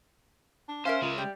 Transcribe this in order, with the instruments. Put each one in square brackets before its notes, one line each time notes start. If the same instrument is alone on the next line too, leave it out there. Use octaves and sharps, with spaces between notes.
[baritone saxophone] D4
[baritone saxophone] C#4 [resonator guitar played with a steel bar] A#4 E5 F5 [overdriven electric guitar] C5
[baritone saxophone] C#2 [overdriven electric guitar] C#3 G#3
[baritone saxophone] G3 [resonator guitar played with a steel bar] D5